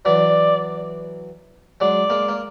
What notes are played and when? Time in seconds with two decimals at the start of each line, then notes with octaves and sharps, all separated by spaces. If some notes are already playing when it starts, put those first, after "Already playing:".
0.05 E3 F#3 D5
1.80 F#3 G#3 D5
2.10 G#3 A#3
2.29 A#3